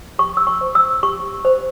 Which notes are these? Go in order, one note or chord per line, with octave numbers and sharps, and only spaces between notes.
G4 C#6
E6
C#6
C5
E6
G4 C#6
C5